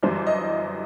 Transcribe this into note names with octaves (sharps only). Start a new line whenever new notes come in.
G1 F#2 E3 G3 C5
D#5